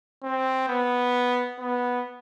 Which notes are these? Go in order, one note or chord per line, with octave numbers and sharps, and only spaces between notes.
C4
B3
B3